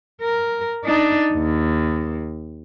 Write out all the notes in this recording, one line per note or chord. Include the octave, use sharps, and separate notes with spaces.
A#4
D4 D#4
D#2